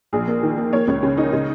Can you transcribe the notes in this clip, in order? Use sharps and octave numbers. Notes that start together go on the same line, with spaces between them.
A#1 G#4
A#3
D#3
A#3
A#3 C#5
C#2
C#3
D#4
C#3